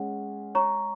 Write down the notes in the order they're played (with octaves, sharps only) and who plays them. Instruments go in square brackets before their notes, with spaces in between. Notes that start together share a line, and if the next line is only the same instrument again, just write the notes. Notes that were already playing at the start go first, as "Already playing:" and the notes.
Already playing: [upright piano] G#3 C#4 [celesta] F#5
[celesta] C#5 A#5 C#6